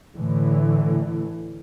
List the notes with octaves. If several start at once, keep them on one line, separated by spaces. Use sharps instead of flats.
A2 D3 E3